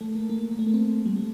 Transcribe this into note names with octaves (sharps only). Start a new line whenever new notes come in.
A3
A#3
A#3
A#3
A3
A#3
C4
G3
A3